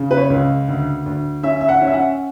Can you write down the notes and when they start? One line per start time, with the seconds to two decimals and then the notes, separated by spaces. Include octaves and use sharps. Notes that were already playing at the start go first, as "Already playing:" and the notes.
Already playing: C#3
0.11 B4
0.17 C#5
0.30 C#2
0.68 D2
1.06 D2
1.43 C#4 E5
1.61 E5
1.68 F#5
1.82 C#4
1.87 E5
1.93 F#5